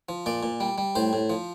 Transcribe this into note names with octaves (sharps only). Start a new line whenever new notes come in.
F3
A#2 D5
A#2
G3
G3
A2 C5
A2
F3